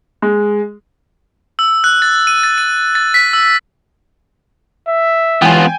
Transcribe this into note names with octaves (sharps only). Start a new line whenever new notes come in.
G#3
E6
F#6
A6
D#7
A6
D#7
A6
B6
E6
E5
E3 G#3 B3 F4 C#5 G5 G#5